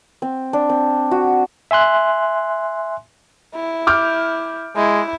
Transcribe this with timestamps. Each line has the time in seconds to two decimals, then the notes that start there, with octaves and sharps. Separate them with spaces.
0.22 C4
0.53 D4
0.69 C4
1.11 F#4
1.71 E5 G#5 C6 F#6
3.55 E4
3.87 D6 F6 G6
4.76 G#3 E4